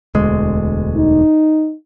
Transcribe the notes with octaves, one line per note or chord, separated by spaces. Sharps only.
E1 D2 G#3
D#4